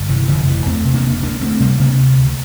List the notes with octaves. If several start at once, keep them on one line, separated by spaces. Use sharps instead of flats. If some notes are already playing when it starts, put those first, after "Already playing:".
Already playing: G1
C3 E3
F1 D3 F3
F1 E3
E2 A3 C4
C3
A#3 D4
F1
D2 A#3 D4
D2 A3 C4
C3 G3 A#3
C3 A#3 D4
D2
D2